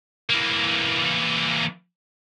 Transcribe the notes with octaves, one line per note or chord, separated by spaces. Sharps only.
E3 A#3